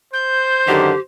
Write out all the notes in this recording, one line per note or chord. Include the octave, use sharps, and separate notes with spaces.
C5 G6
F#2 D3 D#3 G4